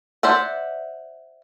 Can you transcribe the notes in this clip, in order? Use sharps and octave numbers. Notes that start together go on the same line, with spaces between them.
C5 D5 E5 F#5